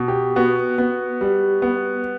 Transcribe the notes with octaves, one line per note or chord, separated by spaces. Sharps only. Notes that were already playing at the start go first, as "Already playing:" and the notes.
Already playing: B2
G4
B3 F#4
B3
G3
B3